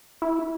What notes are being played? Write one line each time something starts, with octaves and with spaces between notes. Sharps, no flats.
E4